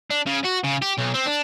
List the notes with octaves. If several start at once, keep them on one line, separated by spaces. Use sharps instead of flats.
D4
C#3
F#4
C#3
G4
B1
C4
D4